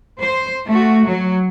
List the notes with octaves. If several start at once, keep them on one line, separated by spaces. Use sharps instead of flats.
C5
A3 F#4
F#3